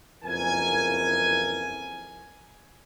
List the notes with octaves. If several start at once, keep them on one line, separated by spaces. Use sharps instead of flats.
F#1 F2 E3 A#4 G#5